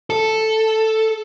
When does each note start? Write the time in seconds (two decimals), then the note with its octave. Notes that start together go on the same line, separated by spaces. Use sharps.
0.10 A4